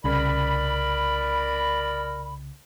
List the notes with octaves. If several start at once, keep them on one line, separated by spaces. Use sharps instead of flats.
C2 C#3 A#4 D5 B5